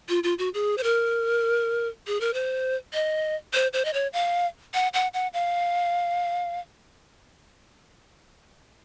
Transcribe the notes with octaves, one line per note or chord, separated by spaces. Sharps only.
F4
F4
F#4
G#4
C5
A#4
G#4
A#4
C5
D#5
C5
C5
D#5
C#5
F5
F#5
F#5
F#5
F5